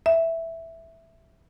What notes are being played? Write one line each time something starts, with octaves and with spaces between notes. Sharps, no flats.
E5